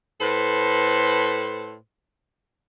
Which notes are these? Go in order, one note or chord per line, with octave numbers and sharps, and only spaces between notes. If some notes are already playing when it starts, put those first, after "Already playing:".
A2 A4 B4 C5